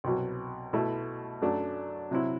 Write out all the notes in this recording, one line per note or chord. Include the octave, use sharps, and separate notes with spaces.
C2 B2 F#3
B2 A3 E4
F#2 F#3 A3 D4
C3 F#3 C4 E4